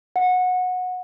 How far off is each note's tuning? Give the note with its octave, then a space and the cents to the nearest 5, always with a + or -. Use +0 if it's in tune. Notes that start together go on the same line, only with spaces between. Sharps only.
F#5 -20